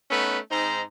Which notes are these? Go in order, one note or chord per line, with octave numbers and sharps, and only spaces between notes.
A3 B3 C#4 D#4 B4
G#2 C4 D#4 C5 A#5